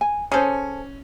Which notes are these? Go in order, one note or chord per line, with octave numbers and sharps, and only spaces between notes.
G#5
C#4 G#4 A4 C5 G#5